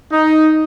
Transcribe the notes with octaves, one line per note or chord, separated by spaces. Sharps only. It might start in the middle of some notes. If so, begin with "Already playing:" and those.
D#4